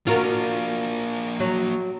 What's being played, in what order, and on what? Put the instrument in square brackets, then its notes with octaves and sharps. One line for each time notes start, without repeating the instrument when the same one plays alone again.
[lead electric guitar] A#3 D4 [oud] F4 F#4 A#4
[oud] F#3